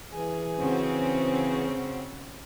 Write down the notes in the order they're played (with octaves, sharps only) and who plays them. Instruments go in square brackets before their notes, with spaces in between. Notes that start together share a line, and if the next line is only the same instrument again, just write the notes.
[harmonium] E3 G#4 G#5
[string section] C#3 C4 F#4